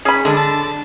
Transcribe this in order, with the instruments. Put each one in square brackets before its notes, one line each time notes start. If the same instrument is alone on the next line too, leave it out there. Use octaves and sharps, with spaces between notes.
[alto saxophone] C#4 [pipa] G#4 B5
[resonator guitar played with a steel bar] D3 D4 [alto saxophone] G#3
[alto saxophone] A5